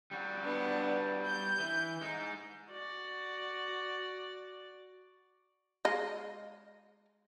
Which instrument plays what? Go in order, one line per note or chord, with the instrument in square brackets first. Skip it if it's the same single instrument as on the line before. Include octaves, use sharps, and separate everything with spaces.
[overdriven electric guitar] G3 F#4
[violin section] B3 D4
G6
[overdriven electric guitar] E3
G#3 D#4
[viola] F#4 D5
[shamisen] G#3 D#5 F5